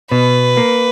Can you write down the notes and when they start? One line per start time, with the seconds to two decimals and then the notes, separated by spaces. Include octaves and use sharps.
0.11 B2 B4
0.57 A#3